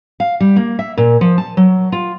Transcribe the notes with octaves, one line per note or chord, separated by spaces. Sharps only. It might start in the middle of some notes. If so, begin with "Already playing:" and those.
F5
G3
A#3
E5
A#2
F3
A5
F#3
F4